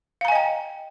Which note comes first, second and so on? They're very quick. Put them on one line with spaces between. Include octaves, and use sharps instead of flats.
F5 A#5 G#5 D#5 G5